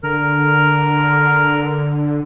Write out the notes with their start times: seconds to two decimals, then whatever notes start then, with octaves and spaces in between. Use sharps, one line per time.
0.03 D3 A#4 F6